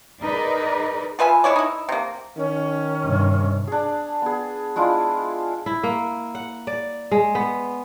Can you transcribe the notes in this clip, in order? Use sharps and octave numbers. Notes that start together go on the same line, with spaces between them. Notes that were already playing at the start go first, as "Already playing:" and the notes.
D#4 G#4 A#4 B4 D5 D#5
F4 B4 E5 G#5
G#3 E4 C#5 D5
D#4 E4
C3 A#3
D#3 C#4
G2 C3
D4 G#4
B3 G#4
G#3 D4 E4 F4
E4
A#3
F#5
D5
G#3
B3